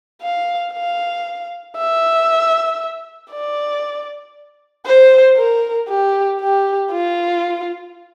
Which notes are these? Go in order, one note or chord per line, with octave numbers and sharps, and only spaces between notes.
F5
F5
E5
D5
C5
A#4
G4
G4
F4